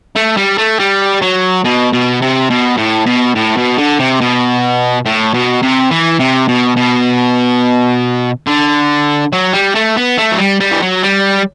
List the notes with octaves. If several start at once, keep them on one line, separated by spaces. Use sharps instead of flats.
A3
G3
A3
G3
F#3
B2
B2
C3
B2
A2
B2
A2
B2
D3
C3
B2
A2
B2
C3
E3
C3
B2
B2
D3
F#3
G3
A3
B3
A3
F#3
G3
G3
E3
F#3
G3